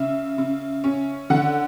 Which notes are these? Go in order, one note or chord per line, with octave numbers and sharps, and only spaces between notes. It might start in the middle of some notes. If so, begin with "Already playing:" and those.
Already playing: C#3 E5
C#3
C#4
D3 F#5